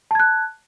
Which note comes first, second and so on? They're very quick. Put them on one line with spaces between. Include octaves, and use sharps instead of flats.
A5 G#6 F#6